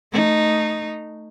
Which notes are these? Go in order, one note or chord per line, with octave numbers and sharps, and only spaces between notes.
A3 D#4